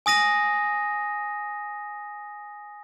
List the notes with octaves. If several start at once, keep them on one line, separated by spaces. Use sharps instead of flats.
G#5 D#6 A#6 D#7